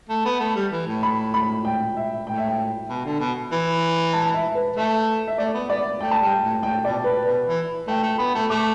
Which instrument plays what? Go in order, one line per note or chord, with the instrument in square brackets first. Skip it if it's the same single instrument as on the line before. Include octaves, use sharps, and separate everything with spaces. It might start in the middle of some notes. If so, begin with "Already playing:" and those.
[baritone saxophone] A3
B3
A3
G3
E3
A2
[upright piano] B5
B5
G5
E5
[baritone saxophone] A2 [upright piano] G5
[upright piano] E5
G5
[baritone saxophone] B2
D3
B2
E3
[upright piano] A5
E5
B4
[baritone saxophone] A3 [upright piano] E5
[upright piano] E5
[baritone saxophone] A3 [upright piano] D5
[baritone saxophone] B3
[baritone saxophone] B3 [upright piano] D5
[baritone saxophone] A3 [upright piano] G5
[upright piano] A5
[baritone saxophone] G3 [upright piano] G5
[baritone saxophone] A2
[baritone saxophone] A2 [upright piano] G5
[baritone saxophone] B2 [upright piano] D5
[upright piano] B4
[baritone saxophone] B2 [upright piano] B4
[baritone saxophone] E3
[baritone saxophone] A3 [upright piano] G5
[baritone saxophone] A3
[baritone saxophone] B3 [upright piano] B5
[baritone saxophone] A3
[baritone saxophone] A3 [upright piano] D6